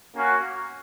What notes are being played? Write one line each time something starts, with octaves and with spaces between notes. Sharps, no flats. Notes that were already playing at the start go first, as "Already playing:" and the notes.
A#3 C#4 F#4